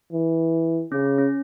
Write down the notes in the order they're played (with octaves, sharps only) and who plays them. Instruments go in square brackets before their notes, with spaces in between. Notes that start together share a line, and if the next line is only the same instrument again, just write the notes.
[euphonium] E3
[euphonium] C#3 [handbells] C#4
[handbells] C#4
C#4